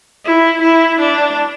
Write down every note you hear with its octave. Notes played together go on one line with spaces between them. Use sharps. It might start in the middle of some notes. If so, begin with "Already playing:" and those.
E4
E4
D4